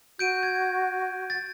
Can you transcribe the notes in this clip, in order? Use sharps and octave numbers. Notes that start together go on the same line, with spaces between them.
F#4 G6 D7 D#7
G#6
A6